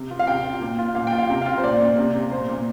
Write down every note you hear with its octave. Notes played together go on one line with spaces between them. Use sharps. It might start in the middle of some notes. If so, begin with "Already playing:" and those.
Already playing: C3
F4
F5
C3 G5
F4
A#2
F4
A#2 F5
G5
F4
F5
C3 G5
F4 F5
C5
A#2 D5
A#2
C3
C3
A#2 C5
A#2